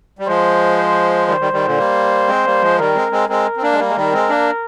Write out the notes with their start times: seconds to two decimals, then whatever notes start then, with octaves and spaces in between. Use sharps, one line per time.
0.19 G3
0.27 F3 G#3 C5
0.77 C5
1.27 D#3 G3 C5
1.40 D#3 G3
1.53 D#3 G3
1.65 A#2 D3
1.77 G3 A#3
2.28 G#3 C4
2.45 G3 A#3
2.62 F3 G#3
2.78 D#3 G3 A#4
2.95 G#3 C4
3.12 G#3 C4
3.29 G#3 C4 A#4
3.57 C4
3.62 A#3 D4
3.73 G#3
3.79 G3 A#3 A#4
3.88 G#3
3.96 D#3 G3
4.13 G#3 C4
4.29 A#3 D4